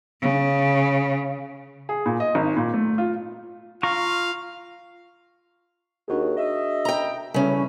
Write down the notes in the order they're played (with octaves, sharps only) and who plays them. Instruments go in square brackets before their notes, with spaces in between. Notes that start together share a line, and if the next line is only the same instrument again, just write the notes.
[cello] C#3
[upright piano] G#4
A#2
D#5
G#1
A#2
A3
F4
[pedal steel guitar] F4 A#5 C#6 [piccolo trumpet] F5
[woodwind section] D#2 [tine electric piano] D4 F#4 G#4
[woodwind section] D#5 E5
[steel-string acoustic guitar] G5 A#5
[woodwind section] F#2 E3 A3 [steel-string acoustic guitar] C#3 C#4 [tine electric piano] G3